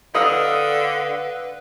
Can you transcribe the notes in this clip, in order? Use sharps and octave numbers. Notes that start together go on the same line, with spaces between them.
D3 B4 D#5 F5 F#5 D#6 E6